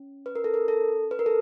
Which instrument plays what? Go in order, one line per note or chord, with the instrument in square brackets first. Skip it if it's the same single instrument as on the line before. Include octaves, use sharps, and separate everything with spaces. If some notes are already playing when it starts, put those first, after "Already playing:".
Already playing: [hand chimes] C#4
B4
A#4
A4
A#4
A4
B4
A#4
A4